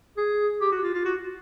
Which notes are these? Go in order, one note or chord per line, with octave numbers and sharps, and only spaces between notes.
G#4
G4
F#4
F4
F4
F#4